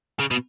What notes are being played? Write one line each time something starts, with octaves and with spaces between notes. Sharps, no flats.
C#3
B2